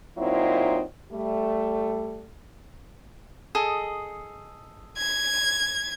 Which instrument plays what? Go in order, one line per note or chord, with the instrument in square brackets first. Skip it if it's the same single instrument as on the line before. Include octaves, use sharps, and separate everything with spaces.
[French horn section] A#2 F#3 C4 D#4 E4
G3 A3
[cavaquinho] G#4 A4 D#5
[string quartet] G#6